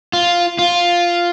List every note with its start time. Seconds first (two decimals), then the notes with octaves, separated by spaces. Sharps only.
0.13 F4
0.59 F4